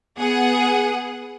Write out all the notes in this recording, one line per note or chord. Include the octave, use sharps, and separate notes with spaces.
B3 G#4 F#5